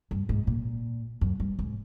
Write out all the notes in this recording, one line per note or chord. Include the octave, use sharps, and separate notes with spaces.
G2
G#2
A#2
F#2
G2
G#2